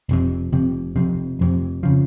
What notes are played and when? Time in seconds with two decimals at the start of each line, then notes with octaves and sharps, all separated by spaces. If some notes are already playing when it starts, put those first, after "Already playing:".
0.09 F1 F2 C3
0.52 F1 F2 C3
0.96 F1 F2 C3
1.39 F1 F2 C3
1.83 C#3 F3